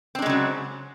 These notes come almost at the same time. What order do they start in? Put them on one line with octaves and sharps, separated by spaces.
C4 D4 G#3 C#3 F#3